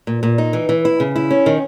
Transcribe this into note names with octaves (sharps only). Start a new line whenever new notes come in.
A#2
A#2
D#4
E3
E3
E4
C#3
E4
C#4
D#3